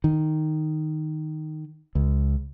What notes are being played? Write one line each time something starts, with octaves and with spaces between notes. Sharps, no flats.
D#3
C#2